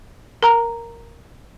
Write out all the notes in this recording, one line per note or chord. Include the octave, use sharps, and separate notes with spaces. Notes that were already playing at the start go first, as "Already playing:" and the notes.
A#4 A#5